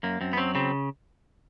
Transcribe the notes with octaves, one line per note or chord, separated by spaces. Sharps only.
F#2 A#3
F#2 C4
B3
F#3 C4
C#3 C4